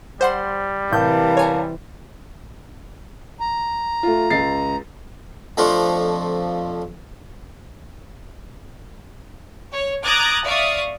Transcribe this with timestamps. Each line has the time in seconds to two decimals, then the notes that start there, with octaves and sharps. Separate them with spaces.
0.21 G3 C5 F#5 C6
0.92 A2 C3 E3 A#4 F5 A5 G6
1.37 C#5 G#5 A#5
3.40 A#5
4.03 A3 F4
4.30 C#2 A6 C7
5.57 F2 F3 A3 D4 F4
9.73 C#5
10.04 A#5 D6 D#6 F#6 G#6 A6
10.44 D5 E5 F5 C#6 D#6